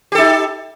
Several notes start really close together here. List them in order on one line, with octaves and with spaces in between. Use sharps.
G4 A4 D#4